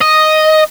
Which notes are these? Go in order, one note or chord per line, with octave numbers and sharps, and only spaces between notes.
D#5